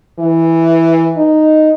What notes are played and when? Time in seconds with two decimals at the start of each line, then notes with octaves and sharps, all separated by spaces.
0.19 E3
1.17 D#4